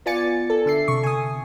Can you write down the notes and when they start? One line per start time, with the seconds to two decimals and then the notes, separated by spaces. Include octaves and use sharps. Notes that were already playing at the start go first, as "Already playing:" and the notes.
0.06 B3 F4 D5 G#5 A6 C#7
0.50 A4
0.66 D3 E5 C7
0.88 C3 C#6
1.03 G#5 D#6